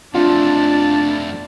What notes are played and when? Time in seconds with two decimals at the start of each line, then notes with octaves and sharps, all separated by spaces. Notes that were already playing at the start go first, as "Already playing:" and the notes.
0.14 F2 A3 D4 F4 D5 A5